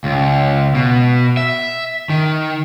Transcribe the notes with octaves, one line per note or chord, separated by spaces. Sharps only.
C#2
B2
E5
D#3